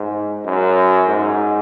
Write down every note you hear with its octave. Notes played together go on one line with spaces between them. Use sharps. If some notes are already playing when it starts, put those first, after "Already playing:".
Already playing: G#2
F#2
G#2